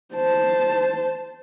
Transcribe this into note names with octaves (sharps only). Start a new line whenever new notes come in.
C5 A5